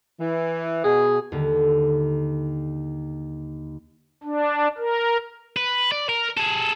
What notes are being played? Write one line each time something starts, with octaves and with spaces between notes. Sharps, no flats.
E3
B2 G#4
D#2 D3
D4
A#4
B4
D5
A#4
G#4 A4